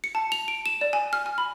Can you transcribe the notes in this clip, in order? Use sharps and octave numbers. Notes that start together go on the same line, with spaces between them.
C#7
A5
F7
D7
E7
D5
G#5
F6
G#5
B5